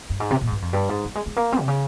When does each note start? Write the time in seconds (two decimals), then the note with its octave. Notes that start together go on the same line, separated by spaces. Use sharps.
0.10 G2
0.20 G#2
0.31 C3
0.41 A#2
0.47 G#2
0.52 G2
0.62 F2
0.73 G2
0.89 G#2
1.04 G3
1.15 G#3
1.26 G#3
1.36 A#3
1.52 C4
1.61 C3
1.68 C#3